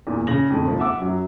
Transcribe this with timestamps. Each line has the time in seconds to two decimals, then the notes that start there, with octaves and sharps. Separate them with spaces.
0.07 E2 A#2 E3
0.27 C#3 A#6 F#7
0.50 F2 G#2 D3
0.65 D#2 C3 F3
0.80 E5 F#5 D6 E6
0.97 F#2 F#3